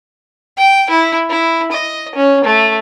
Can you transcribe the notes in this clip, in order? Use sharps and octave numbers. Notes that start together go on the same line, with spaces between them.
G5
E4
E4
D#5
C#4
A3